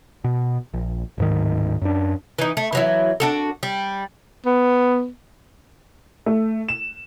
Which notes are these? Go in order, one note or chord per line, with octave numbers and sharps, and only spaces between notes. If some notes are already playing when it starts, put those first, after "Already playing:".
B2
A#1
D1 G#2 D#3
F#2 D4
E3 D#4
A3
E3 F#3 E4
D4 F#4 A4
G3
B3
A3
E7